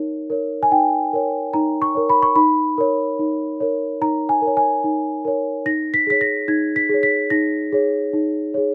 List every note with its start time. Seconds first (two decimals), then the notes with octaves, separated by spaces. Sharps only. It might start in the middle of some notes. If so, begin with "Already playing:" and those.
Already playing: D#4 A#4 C#5
0.30 A#4 C#5
0.63 G#5
0.72 D#4 G5
1.13 A#4 C#5
1.54 D#4 A#5
1.82 C#6
1.95 A#4 C#5
2.09 B5
2.23 C#6
2.36 D#4 B5
2.78 A#4 C#5
3.19 D#4
3.60 A#4 C#5
4.01 D#4 A#5
4.29 G#5
4.42 A#4
4.47 C#5
4.57 G#5
4.84 D#4
5.25 A#4 C#5
5.66 D#4 A#6
5.94 B6
6.07 G#4 C#5 B6
6.21 A#6
6.48 D#4 G#6
6.76 B6
6.89 G#4 C#5
7.03 B6
7.30 D#4 A#6
7.72 G#4 C#5
8.13 D#4
8.54 G#4 C#5